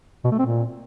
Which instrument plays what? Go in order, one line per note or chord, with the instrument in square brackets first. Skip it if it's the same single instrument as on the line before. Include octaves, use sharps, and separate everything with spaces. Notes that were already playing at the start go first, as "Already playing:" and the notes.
[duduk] B2
A3
C4
A#2